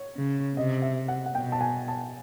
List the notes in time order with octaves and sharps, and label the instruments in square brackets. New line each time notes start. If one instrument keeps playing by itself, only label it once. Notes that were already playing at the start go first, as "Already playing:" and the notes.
Already playing: [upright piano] C#5
[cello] C#3
[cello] C3 [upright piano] D#5
[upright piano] E5
F#5
F#5
[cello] B2 [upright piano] G5
[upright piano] A5
G#5
A5